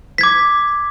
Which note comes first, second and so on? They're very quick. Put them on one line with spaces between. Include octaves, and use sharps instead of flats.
B6 G#6 D6